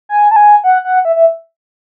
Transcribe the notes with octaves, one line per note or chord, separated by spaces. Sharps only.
G#5
A5
G#5
F#5
F#5
E5
E5